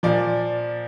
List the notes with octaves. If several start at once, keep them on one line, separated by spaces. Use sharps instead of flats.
A#2 F3 D5